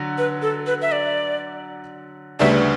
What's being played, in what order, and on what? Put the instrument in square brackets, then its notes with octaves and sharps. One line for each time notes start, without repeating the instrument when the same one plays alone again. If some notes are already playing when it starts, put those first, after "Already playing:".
Already playing: [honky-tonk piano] D3 F#3 F#4
[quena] B4
A4
B4
E5
D5
[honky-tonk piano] D2 C#3 G3 B3 D4 [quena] E5